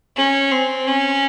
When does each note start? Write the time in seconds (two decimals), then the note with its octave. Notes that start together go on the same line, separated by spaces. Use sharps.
0.16 C#4
0.51 C4
0.87 C#4